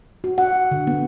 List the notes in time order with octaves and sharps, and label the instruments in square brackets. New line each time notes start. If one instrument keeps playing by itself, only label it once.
[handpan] F#4
F#5
D3
B3